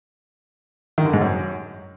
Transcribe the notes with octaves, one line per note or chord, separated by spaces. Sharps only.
D#3
D3
G#2
F#2